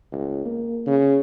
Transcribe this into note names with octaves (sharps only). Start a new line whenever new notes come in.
C#2
A#3
C#3